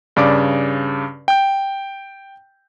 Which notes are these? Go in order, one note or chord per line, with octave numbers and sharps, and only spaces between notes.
G2 C#3 D5 D6
G5 G6